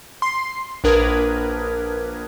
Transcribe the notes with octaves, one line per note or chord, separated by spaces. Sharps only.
C6 C7
A#1 D4 A#4 B4 D#6 G#6